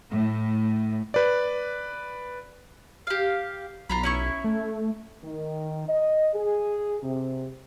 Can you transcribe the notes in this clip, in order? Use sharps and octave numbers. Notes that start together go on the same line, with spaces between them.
A2
B4 D5
G4 F5
B1 F4 A#5 B5
C#4 E4 C#6
A3
D#3
D#5
G#4
C3